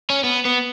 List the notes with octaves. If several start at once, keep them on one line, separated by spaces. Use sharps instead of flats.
C#4
B3
B3